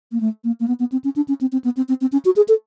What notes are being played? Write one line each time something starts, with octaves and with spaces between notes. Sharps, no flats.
A#3
A3
A#3
A#3
B3
B3
C4
C#4
D4
C#4
C4
C4
B3
C4
C4
C4
C#4
F#4
G#4
A4